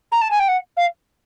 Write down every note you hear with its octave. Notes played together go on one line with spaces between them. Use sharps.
A#5
A5
G#5
G5
F#5
F5